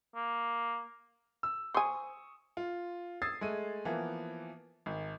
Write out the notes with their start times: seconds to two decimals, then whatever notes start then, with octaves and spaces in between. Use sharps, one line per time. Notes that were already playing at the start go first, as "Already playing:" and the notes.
0.16 A#3
1.43 E6
1.74 C5 G#5 C#6 D#6
2.57 F4
3.22 D#6 E6 G#6 A6 C7
3.41 G#3 A3 D#7
3.85 E3 F3 A#3 B3
4.86 G#1